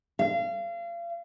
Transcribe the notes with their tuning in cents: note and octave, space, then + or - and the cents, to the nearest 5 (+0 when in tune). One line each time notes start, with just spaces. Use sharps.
F5 -35